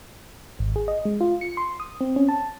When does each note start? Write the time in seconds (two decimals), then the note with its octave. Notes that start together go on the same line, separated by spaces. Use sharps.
0.59 G#1
0.76 G#4
0.88 D#5
1.05 G#3
1.21 F4
1.41 C#7
1.57 C6
1.80 D#6
2.01 C4
2.16 C#4
2.29 A5